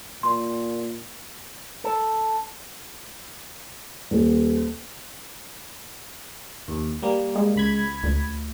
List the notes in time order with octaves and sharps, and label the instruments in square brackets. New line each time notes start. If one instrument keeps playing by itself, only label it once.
[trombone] A#2 [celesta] C6
[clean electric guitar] A4
[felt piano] D#1
[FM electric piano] D#2
G3 A#3
[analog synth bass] G#3
[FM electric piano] C#2 B5 G#6
[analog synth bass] D2